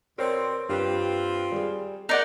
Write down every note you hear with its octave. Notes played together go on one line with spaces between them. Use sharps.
B2 C4 A#4 C#5 D5
G2 C4 F4 G4 B4
G3 G#4
D#4 A#4 D5 F#5